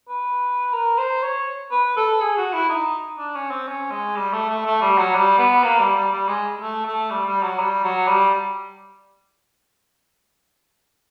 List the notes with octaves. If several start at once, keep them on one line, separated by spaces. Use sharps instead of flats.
B4
A#4
C5
C#5
B4
A4
G#4
F#4
E4
D#4
D4
C#4
C4
C#4
G#3
G3
A3
A3
A3
G3
F#3
G3
B3
A#3
G3
G3
G3
G#3
A3
A3
G3
G3
F#3
G3
F#3
G3